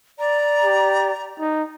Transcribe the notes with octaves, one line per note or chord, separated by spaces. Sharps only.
D5 A#5
G4
D#4